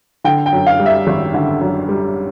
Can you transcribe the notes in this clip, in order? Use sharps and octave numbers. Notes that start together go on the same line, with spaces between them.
D3 G5
G5
F#2
F5
G3
E5
G#1
D3
F#2
G3